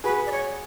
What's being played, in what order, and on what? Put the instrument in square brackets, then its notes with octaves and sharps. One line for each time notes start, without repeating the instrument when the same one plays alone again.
[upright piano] F#4 G#4 [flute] B4
[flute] D5
C#5